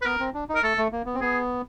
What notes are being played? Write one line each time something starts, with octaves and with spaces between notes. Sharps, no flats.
B4
B3 A#4
C4
D4
D#4
A#4
A3 A4
A3
A#3
B3
C4
B3 G#4